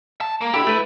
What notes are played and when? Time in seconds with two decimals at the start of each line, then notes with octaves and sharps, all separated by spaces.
0.21 A5
0.41 A#3
0.54 D3 E4 G4
0.67 A3 B4